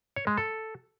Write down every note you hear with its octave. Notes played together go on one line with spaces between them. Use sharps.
C#5
G#3
A4